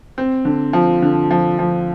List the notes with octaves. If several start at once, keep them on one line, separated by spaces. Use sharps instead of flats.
C4
D3
F3
D3
F3
F3